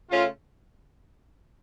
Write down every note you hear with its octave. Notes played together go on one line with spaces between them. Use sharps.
C#3 A3 C#4 F4